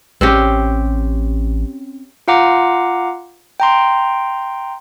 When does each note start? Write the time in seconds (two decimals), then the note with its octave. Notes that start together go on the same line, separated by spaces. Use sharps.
0.21 A1 C4 C#4 G4
2.28 F4 F5 F#5 A#5 D6
3.60 G5 A#5 C6